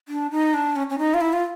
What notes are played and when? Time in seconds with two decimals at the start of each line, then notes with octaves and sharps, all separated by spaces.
0.08 D4
0.31 D#4
0.54 D4
0.76 C#4
0.90 C#4
0.98 D#4
1.14 F4
1.21 E4
1.33 F4